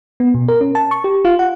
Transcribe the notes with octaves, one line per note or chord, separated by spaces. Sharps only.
B3
B2
A#4
C#4
A5
C#6
G4
F4
F#5